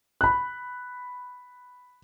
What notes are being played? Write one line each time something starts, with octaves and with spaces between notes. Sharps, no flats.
B5 F#6